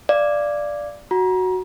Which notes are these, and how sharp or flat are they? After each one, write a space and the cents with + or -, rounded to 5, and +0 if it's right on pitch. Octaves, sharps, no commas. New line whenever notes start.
D5 +0 F5 -20
F#4 +0 A#5 +30